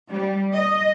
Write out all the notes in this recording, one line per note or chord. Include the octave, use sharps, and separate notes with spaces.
G3
D#5